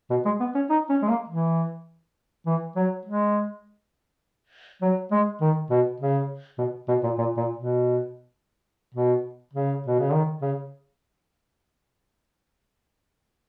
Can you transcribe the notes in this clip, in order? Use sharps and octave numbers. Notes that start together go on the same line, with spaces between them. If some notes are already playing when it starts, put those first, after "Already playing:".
B2
G#3
B3
C#4
D#4
C#4
G#3
A#3
E3
E3
F#3
G#3
F#3
G#3
D#3
B2
C#3
B2
B2
A#2
A#2
A#2
B2
B2
C#3
B2
C#3
D#3
C#3